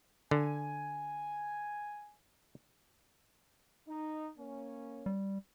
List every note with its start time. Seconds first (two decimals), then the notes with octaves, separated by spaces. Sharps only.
0.31 D3 G#5
3.87 D#4
4.38 A#3 C#4
5.06 G3